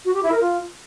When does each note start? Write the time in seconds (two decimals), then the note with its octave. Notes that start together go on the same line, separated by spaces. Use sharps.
0.05 F#4
0.14 G4
0.23 E4
0.32 A#4
0.41 F4